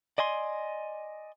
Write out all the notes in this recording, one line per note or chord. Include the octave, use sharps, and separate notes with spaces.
D5 D#5 G#5 C6